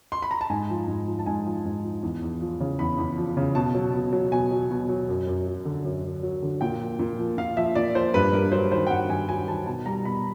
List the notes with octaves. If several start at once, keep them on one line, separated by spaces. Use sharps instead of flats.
C6
B5
A#5
A5
G#2 G#5
F3
G#2
F3
A5
G#2 G#5
F3
G#2
F3
E2
E2
F3
C#3
E2 B5
E2
F3
C#3
B2 A5
F#3
B2
F#3
B2 G#5
F#3
B2
F#3
F#2
F#2
F#3
D3
F#2
F#2
F#3
D3
A#2 G5
F3
A#2
F3
A#2 F5
F3 E5
A#2 D5
F3 C5
G2 B4
G2 A#4
F#3 C5
D#3 C5
G5
G2 F#5
G2 G#5
F#3 G#5
D#3 A5
B2 A5
G3 A#5
B2 B5